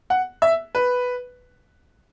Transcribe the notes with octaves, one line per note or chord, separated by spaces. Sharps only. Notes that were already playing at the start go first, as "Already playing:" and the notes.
F#5
E5
B4